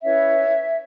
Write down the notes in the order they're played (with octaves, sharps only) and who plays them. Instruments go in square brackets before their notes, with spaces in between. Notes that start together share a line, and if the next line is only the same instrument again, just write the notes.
[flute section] C#4 E4 B4 C#5 E5